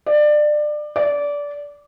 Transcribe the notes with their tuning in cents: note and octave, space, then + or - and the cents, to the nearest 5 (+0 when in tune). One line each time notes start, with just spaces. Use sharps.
D5 +25
D5 -20